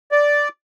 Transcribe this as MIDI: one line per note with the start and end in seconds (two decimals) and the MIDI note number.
0.12 0.49 74